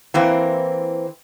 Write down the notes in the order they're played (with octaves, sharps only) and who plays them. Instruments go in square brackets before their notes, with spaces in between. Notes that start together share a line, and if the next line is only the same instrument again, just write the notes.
[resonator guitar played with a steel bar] E3 A#3 C4